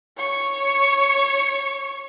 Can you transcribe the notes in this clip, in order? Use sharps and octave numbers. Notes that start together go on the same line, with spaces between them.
C#5 C#6